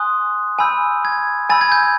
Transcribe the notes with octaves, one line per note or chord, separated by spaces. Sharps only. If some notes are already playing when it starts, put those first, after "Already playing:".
Already playing: G#5 C6 D#6 F#6
G#5 B5 E6 G6
G#6
G#5 B5 E6 G6 A6
G#6
G6
G#6